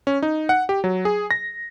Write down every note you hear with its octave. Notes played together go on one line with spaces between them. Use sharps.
C#4
D#4
F#5
G4
F#3
G#4
A#6